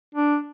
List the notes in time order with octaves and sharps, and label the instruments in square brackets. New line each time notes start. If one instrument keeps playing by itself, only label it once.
[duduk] D4